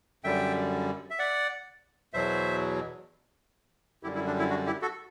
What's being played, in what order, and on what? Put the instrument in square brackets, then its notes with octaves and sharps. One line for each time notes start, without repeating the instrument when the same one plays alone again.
[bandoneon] F#2 D3 G3 E5 G5
E5
D5 F#5
E2 B2 F#3 C5 E5
F#2 D3 G3 E4 G4
E4
D4
E4
D4 F#4
E4 G4
F#4 A4